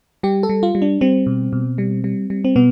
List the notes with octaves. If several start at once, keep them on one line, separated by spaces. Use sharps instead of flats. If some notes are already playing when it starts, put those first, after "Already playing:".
G3 G4
A4
G3
F4
G3
D4
G3 C4
B2
B2
G3
G3
G3
C4
B2 B3